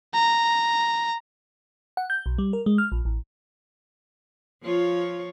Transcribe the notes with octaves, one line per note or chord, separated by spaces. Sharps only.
A#5
F#5
G6
B1
G3
A#4
G#3
F6
A#1
A1
F3 F4 C#5